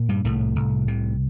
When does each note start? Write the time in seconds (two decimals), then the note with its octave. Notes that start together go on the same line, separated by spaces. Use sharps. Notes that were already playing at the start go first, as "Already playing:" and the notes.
Already playing: A#2
0.09 G2 G3
0.24 C2 A2 A3
0.56 C2
0.88 C3